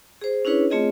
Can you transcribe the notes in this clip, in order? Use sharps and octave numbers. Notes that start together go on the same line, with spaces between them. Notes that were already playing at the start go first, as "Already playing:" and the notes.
G#4 C5
C#4 D4 E4 G#4 B4 C#5
A3 C4 F4 G#4 C#5 D#5